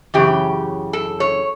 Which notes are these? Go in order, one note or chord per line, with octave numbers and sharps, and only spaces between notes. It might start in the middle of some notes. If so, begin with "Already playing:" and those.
F#2 C#3 E3 G4
A4
C#5